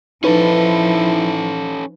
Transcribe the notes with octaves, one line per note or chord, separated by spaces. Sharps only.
F3 C#4 D#4 E4 A4 B4